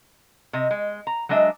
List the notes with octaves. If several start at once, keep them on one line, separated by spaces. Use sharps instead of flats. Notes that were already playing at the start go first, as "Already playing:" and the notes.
C3 D#5
G#3
A#5
F#3 G#3 D4 D#5 E5